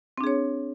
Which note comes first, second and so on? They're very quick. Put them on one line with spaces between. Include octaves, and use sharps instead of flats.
C4 D4 G#4 C#5